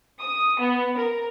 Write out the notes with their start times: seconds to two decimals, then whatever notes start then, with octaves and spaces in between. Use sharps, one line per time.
0.20 D#6
0.60 B3
0.98 A#4